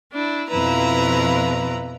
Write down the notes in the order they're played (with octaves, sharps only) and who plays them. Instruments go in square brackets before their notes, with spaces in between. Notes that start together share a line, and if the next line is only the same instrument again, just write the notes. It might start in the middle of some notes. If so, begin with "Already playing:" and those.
[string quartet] D4 E4
F2 B2 F3 E4 B4 A#5